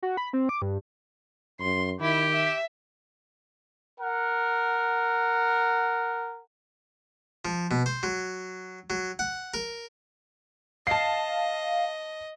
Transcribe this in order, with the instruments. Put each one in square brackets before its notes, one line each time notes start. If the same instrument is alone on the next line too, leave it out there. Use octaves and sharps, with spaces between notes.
[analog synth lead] F#4
B5
C4
D6
G2
[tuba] F#2 [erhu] C6
[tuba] D#3 [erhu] E4 [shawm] G4
[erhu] E5
[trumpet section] A#4 F#5
[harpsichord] F3
B2
C5
F#3
F#3
F#5
A#4
[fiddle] D#5 [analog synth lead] F5 [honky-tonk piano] A5 C7